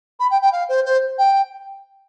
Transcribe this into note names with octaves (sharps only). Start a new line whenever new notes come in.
B5
G5
G5
F5
C5
C5
G5